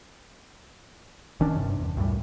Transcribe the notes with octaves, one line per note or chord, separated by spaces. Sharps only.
F#1 D#3 C#4 D4
G2 C3
E2
C#2 F#2 A2 G3